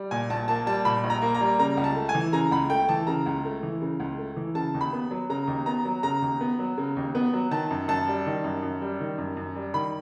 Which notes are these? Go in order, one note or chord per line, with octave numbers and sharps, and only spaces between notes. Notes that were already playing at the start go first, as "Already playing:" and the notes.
Already playing: G3
A#2 G#5
A#1 A5
A#3 A5
G3 A5
A#2 B5
A#1
A#5
A#3
A#5
G3
C#3 A#5
C#2
A5
A3
G#5
E3
C#3 A#5
C#2 B5
A3 G5
E3 A5
C#3 A#5
C#2
A3
E3
C#3
C#2
A3
E3
C#3 A5
D#2
B5
B3
F#3
C#3 A#5
D#2
B3 A#5
F#3
C#3 A#5
D#2
B3
F#3
C#3
D#2
B3
F#3
D#3 A5
F#2
F#2 A5
G3
D#3
F#2
F#2
G3
D#3
F#2
F#2
G3
D#3 B5